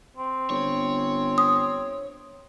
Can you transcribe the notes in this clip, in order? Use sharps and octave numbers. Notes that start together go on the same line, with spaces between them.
C4
G1 C#5
D#6